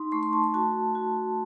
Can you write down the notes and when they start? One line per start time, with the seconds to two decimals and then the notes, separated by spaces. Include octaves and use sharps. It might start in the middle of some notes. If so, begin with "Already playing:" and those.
Already playing: D#4 C6
0.12 A3 C#6
0.23 C6
0.33 A5
0.44 C6
0.54 F#4 A5
0.95 F#4